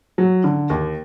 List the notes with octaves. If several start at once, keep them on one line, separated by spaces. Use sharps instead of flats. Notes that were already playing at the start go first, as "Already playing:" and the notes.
F#3
D3
D#2